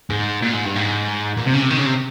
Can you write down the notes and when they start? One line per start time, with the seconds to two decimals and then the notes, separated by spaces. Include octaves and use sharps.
0.10 G#2
0.42 A#2
0.53 G#2
0.64 G2
0.76 G#2
1.37 A#2
1.46 C3
1.54 C#3
1.62 C3
1.70 D#3
1.78 C#3
1.86 C3